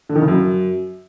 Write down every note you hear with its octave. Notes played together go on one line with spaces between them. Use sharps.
D3
D#3
C#3
F#2